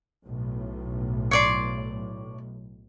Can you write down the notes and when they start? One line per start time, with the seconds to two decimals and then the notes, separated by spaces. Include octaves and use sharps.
0.24 B1 A2
1.31 C#5 D5 C6